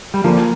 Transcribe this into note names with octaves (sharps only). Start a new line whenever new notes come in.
G3
D3 F3 A#3